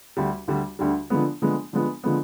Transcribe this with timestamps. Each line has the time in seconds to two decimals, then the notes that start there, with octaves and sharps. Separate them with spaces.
0.17 D2 D3 G3
0.48 D2 D3 G3
0.79 D2 D3 G3
1.10 D3 F3 G#3 B3
1.42 D3 F3 G#3 B3
1.73 D3 F3 G#3 B3
2.04 D3 F3 G#3 B3